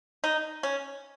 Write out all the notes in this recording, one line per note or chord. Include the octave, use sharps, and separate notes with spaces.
D#4
C#4